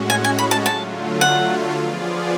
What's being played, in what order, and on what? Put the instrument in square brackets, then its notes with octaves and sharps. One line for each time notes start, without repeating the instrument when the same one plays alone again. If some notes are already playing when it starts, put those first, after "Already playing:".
Already playing: [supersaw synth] A2 G#3 C#4 F#4
[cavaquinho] G#5
G#5
B5
A5
[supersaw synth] D3 F#3 A3 F4 [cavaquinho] A5
[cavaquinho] F#5
[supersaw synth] F3 B3 F4 G#4 D5